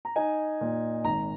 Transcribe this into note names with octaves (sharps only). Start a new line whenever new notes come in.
A#5
D#4 G#5
A#2
G#1 A#5